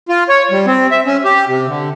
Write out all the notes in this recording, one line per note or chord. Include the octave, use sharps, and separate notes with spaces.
F4
C#5
G3
C4
E5
C#4
G4
C3
D3